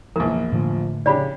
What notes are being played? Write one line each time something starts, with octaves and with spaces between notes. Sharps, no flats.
A#1 E2 A#4
A2 D3 F3
C#3 C#4 D4 G4 D5 B5